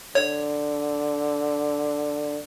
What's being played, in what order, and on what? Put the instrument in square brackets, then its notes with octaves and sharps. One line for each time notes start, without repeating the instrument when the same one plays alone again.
[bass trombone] D3 [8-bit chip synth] C#5